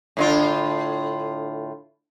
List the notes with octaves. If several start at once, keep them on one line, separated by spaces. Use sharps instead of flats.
A2 D3 F4